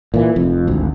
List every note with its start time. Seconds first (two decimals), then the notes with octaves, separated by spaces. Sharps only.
0.14 A#2 E3
0.36 F1 F2
0.67 G#1 D2